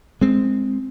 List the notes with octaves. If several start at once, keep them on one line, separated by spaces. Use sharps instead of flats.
G#3 C4